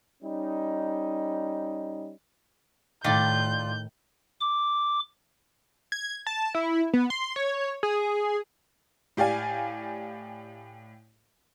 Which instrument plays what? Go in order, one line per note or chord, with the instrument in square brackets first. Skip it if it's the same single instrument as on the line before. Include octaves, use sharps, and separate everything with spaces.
[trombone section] G3 C#4 D#4
[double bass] A2 [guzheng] D#3 [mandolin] F4 D5 [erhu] G6
[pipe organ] D6
[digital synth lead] G#6
A5
E4
B3
C6
C#5
G#4
[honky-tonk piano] A2 G4 D5 F5 G#5